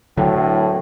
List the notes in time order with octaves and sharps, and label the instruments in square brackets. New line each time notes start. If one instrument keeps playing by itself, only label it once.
[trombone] A2 [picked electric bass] D3 F#3 [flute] G5